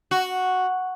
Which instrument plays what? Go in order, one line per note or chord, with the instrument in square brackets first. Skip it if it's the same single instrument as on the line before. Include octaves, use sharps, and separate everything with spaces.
[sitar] F#4